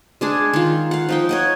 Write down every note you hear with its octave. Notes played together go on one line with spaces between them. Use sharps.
G#3 D4 G#4
D#3 F4
F5 F#5
F3 D#4 G5
C#5 D#5 F#5